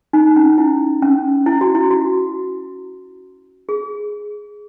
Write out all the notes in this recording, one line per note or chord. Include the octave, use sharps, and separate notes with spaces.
D#4
C#4
E4
C#4
E4
F#4
E4
F#4
G#4